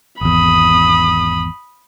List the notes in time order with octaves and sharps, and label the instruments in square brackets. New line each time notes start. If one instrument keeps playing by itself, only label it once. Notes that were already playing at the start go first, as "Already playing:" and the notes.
[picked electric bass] G#1 E2 [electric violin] B5 D#6